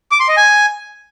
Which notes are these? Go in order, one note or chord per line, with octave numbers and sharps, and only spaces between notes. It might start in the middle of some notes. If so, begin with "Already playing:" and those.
D6
C6
D#5
G#5